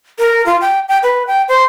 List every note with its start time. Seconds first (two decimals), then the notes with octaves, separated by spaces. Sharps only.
0.19 A#4
0.46 F4
0.61 G5
0.89 G5
1.03 B4
1.27 G5
1.49 C5